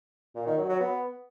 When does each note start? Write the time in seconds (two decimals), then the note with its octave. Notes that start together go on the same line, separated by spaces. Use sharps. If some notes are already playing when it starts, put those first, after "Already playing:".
0.35 A#2
0.47 D#3
0.58 F#3
0.69 F#3
0.80 B3